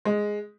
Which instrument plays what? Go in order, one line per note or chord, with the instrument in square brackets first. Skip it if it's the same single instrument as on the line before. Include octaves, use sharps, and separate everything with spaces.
[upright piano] G#3